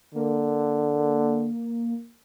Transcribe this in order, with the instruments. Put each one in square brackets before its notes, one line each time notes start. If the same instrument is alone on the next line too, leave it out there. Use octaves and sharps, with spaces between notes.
[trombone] D3 [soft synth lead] A#3